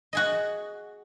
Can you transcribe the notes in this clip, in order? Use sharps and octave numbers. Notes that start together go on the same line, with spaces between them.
F#4 G#4 D#5